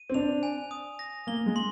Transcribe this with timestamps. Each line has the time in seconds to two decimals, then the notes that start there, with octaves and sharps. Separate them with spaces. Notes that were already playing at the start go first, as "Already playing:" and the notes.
Already playing: D#7
0.10 C4
0.14 D4 F7
0.43 G#5
0.71 D#6
0.99 A#6
1.27 A#3 G7
1.46 G#3
1.56 C6